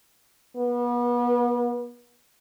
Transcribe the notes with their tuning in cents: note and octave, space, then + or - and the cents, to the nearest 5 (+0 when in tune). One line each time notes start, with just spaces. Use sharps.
B3 -35